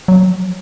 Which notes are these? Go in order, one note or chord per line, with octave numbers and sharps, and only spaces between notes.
F#3
F3